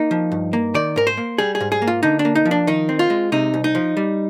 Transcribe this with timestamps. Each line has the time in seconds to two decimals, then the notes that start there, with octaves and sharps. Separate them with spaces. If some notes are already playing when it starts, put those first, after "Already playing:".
Already playing: A#3 D#4
0.11 F3
0.32 G2
0.53 A#3
0.75 D#3 D5
0.96 G#2 A#4
1.07 C5
1.17 A#3
1.38 G3 G#4
1.55 G#4
1.60 G#2
1.72 G#4
1.82 A#3
1.87 F4
2.03 D3 D#4
2.19 D4
2.25 A#3
2.35 D#4
2.45 F3
2.51 D4
2.67 D#3 D#4
2.89 C4
2.99 F4
3.10 G#3
3.32 C3 D#4
3.54 C2
3.64 D#4
3.75 F3
3.97 G3